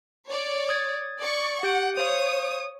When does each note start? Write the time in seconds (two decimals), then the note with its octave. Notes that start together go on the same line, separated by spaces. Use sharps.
0.28 C#5 D5
0.69 D#6 G#6 A6
1.19 D5 C#6
1.63 G4 F#5 G6 D7
1.97 C5 C#5 F5 D#6